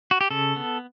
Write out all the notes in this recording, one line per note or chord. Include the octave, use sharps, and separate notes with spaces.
F#4
G4
C#3 A4
B3